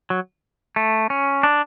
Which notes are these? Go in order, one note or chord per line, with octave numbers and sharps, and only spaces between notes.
F#3
A3
C#4
D4